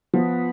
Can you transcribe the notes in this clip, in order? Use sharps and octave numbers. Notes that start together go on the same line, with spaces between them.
F3 B3